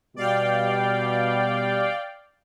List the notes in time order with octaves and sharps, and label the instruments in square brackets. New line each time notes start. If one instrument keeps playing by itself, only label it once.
[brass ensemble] B2 G3 [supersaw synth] D5 F5 G5